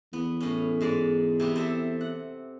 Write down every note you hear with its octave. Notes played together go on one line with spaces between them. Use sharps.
E2 B3
A2 C#4
G#2 G#3 D5
C3 B3 G4
C4 A4 E5
F#5